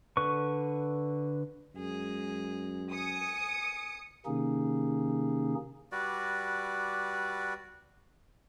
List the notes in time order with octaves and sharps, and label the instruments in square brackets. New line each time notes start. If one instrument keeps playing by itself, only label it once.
[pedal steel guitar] D3 B4 C#6
[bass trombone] F#2 [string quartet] G#3 G#4
[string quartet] G#5 [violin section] D#6 C#7
[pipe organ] C3 D#3 A#3 C#4 D#4 G#4
[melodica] G3 F#4 B4 D5